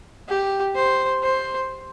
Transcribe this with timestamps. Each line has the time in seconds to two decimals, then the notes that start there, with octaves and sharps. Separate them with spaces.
0.29 G4
0.75 C5
1.23 C5